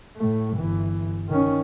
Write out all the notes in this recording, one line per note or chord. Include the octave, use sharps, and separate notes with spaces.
A2 A3
G1 E3
D#3 C#4